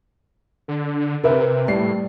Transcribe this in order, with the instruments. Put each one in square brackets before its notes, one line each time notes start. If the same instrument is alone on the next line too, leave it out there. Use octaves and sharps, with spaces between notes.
[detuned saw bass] D3
[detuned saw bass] C3 [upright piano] A#4 B4 E5
[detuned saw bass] A2 [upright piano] G3 C7